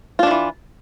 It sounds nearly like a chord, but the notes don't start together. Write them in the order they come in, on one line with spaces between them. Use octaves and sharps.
F4 D4 D#3 E3